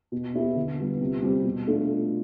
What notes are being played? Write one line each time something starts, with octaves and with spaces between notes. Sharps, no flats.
B2
B3 E4 G4
D3
G3 B3 F4
C3
G3 C4 G4
B2
A3 D4 F4